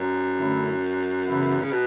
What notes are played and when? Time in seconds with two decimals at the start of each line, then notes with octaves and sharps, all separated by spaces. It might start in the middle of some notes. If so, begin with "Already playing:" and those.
Already playing: F#2
0.38 D3 A3 C#4 E4
1.26 C#3 E3 B3 E4
1.62 C#3
1.71 B2